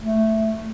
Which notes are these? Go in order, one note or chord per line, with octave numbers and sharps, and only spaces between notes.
A3